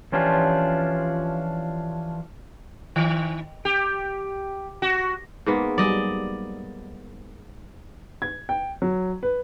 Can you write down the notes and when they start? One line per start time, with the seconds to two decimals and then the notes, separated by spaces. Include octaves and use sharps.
0.12 E3 F3 C#4 D4 F4 G4
2.96 D#3
3.65 G4
4.82 F#4
5.46 G#2 A#3 B3
5.78 F#3 G3 G#4 D5 D#5
8.22 G#6
8.49 G5
8.82 F#3
9.23 B4